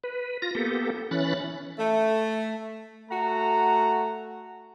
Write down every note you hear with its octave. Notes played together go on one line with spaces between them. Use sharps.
B4
F4 A#6
A#3 B3 G4 A4
E3 C#4 B5 F#6 A6
A3
A3 F#4 F#5 A#5